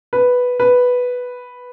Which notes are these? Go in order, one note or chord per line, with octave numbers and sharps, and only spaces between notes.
B4
B4